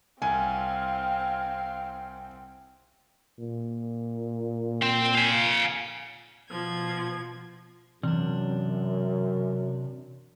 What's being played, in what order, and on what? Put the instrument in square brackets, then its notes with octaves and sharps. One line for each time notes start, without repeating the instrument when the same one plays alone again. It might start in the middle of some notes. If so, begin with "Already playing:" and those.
[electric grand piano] C2 [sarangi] C4 [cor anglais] F5 [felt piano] G#5
[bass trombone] A#2
[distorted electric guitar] C4
F5 G#5
[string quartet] B2 F3 G#6
[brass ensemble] F#2 [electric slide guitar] C3 D4 [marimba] E3